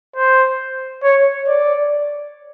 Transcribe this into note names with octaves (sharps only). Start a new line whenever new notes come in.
C5
C#5
D5